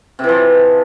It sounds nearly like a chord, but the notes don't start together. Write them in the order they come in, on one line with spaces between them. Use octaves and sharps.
C3 E3 F3